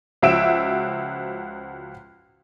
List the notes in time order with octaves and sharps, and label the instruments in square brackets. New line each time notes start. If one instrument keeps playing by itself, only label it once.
[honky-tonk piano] C#2 F3 F#4 E5 D7 E7